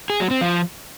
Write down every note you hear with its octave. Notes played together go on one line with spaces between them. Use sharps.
G#4
F#3
C4
F3